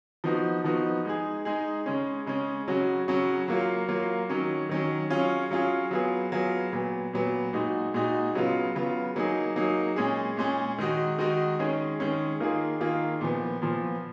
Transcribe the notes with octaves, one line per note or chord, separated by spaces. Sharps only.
F3 B3 D#4 F#4
F3 B3 D#4 F#4
G#3 D#4 G#4
G#3 D#4 G#4
C#3 G#3 C#4
C#3 G#3 C#4
C#3 F#3 C#4 F#4
C#3 F#3 C#4 F#4
F#3 A#3 F4
F#3 A#3 F4
D#3 F#3 C#4
D#3 F#3 C#4
F#3 C#4 F4 G#4
F#3 C#4 F4 G#4
F#3 B3 F4 G#4
F#3 B3 F4 G#4
A#2 F#3 B3
A#2 F#3 B3
A#2 G#3 D#4 F#4
A#2 G#3 D#4 F#4
C#3 F#3 B3 F4
C#3 F#3 B3 F4
F#3 A#3 D#4 G#4
F#3 A#3 D#4 G#4
A#2 G#3 C#4 G#4
A#2 G#3 C#4 G#4
D#3 G#3 D#4 F#4
D#3 G#3 D#4 F#4
D#3 G#3 C#4 G#4
D#3 G#3 C#4 G#4
D#3 A#3 F4 G#4
D#3 A#3 F4 G#4
A#2 F3 B3
A#2 F3 B3